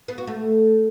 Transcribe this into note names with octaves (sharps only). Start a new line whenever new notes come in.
B3
F#4
A3